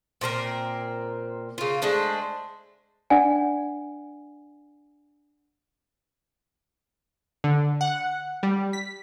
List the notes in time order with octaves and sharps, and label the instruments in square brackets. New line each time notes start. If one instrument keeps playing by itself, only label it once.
[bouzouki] A#2 C4 D4 A#4
C#3 F4
G#3 A3 D4 C5
[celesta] D4 D5 F#5 G#5
[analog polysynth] D3
F#5
G3
B6